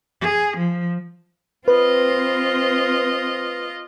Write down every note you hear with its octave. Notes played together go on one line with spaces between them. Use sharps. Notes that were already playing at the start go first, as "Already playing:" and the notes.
G#4
F3
C4 F4 B4 D#5